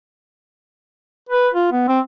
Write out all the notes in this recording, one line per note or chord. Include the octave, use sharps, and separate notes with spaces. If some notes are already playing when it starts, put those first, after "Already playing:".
B4
F4
B3
C4